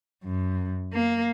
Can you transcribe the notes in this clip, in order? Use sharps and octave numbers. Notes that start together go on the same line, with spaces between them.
F#2
A#3